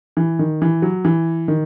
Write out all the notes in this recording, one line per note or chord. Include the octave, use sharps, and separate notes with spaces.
E3
D#3
E3
F#3
E3
D#3